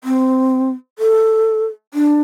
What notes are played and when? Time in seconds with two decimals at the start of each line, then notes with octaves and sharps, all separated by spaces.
0.04 C4
0.99 A4
1.94 D4